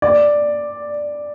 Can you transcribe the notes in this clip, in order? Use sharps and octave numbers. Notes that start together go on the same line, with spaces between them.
D5